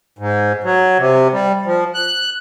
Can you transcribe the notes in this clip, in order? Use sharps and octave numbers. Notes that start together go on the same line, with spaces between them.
G#2
F#3
C3
G3
F3
F#6